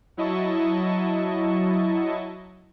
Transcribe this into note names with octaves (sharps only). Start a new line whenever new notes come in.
F#3 E4 D#5 A5 C#6